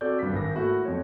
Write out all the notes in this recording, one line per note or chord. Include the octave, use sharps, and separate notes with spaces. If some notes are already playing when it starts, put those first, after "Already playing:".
C4 F#4 A4 D5 G6
G2 B6
G#1 A#6
A3 A#3 E4 F#4
F2 C#5